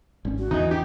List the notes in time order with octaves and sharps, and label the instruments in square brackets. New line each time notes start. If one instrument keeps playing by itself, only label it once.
[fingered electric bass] G#1 C#4
[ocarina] F#4
[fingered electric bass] E2 [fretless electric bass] E3 [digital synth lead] D#4
[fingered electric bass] D4 [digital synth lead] G4